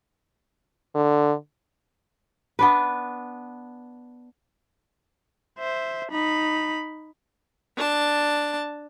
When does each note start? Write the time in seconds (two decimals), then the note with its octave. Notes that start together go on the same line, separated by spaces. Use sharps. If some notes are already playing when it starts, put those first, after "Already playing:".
0.95 D3
2.59 B3 D4 B4
5.59 C5 E5
6.12 D#4 B5
7.77 D4 A5